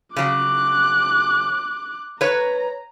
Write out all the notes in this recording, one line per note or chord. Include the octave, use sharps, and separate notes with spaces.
C#3 F#3 D6 F#6
B4 C#5 A#5